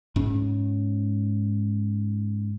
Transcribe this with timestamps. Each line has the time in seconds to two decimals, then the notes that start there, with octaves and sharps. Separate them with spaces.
0.16 G#2 C#4